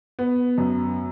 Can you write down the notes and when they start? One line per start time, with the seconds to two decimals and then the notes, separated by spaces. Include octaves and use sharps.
0.19 B3
0.58 F#2